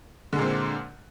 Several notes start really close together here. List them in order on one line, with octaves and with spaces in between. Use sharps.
D3 G#3 A#2 C4